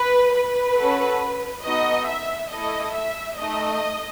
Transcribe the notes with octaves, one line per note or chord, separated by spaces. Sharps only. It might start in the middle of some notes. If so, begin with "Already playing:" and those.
Already playing: B4
B4
C#4 F#4 A4
B3 D#4 F#4 A4 D#5
E5
A3 E4 A4 D#5
E5
A3 D#4 A4 D#5